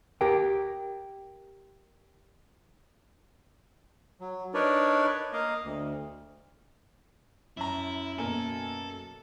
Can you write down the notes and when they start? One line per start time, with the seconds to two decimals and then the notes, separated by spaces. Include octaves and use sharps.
0.21 G4 A#4 G5
4.21 F#3
4.54 D4 D#4 A#4 B4 C#5 D5
5.33 A#3 D#5 F5
5.64 D2
7.57 F#2 E4 A#5
8.18 B2 A#3 A4 G#5